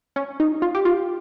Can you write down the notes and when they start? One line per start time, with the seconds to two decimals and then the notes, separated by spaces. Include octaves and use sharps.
0.16 C#4
0.40 D#4
0.62 F4
0.75 G4
0.85 F4